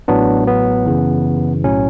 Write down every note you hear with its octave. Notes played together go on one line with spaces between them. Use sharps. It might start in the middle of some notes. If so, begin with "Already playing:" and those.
A1 A2 F#3 B3 D4
B3
F#2 C#3 E3
B1 A2 F#3 C#4